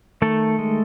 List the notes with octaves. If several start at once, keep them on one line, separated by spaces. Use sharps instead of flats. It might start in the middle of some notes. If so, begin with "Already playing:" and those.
D#3 A3 A4
G#3